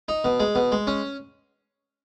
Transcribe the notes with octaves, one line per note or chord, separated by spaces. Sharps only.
D#4
B2
G#3
B2
G#3
C#4